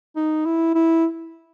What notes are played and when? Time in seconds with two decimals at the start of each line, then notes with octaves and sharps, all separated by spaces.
0.16 D#4
0.45 E4
0.75 E4